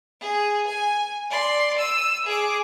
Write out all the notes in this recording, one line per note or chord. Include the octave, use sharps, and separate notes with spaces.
G#4
G#5
D5 C6
E6 D#7
G#4 D6